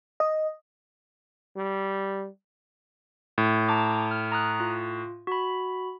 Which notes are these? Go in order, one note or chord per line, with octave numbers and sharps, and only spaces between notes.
D#5
G3
A2
A5 A#5 D6
F6
A#5 D#6 F#6
F4
F#4 B5